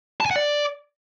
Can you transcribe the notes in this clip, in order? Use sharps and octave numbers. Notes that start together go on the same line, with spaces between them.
A5
G#5
F#5
D5